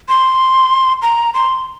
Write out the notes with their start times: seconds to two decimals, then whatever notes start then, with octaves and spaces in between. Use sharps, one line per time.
0.09 C6
1.02 A#5
1.34 C6